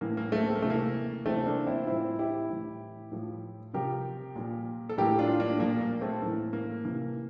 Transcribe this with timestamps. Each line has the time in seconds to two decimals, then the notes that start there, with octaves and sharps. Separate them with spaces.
0.01 A2 E3 A#3
0.17 A#3
0.32 A3
0.48 C4
0.55 A#3
0.62 C3 E3 A3
0.70 A#3
1.26 C3 E3 A3 C4
1.37 C4
1.46 A#3 D4
1.67 C4 E4
1.82 F4
1.87 A2 E3 C4 E4
2.19 E4 G4
2.50 A2 E3
3.12 A2 F3
3.73 C3 F3 G4 A#4
4.36 A#2 F3
4.89 A4
4.98 A2 E3 G4 A#4
5.19 D4 F4
5.40 A#3 D4
5.60 A#2 F3 A#3
5.81 A#3
6.01 A3 C4
6.22 A2 E3 A#3
6.53 A#3
6.85 C3 E3 A#3